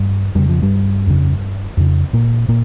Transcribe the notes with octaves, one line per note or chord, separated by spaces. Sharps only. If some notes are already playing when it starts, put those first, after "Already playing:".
Already playing: G2 G3
F2 C#3 G3
F3
G2 G3
F2 C#3
F2 C#3
A#2 A#3
A#2 A#3